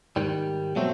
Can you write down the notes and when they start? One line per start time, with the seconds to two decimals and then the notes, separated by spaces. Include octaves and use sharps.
0.16 G#2 D#3 G3
0.76 B2 F#3 A3 C4